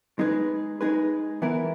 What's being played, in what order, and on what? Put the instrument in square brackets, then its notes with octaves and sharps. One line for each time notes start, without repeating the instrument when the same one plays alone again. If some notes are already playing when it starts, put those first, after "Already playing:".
[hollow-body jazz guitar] G#3 D#4 G#4 B4
G#3 D#4 G#4 B4
E3 B3 E4 A#4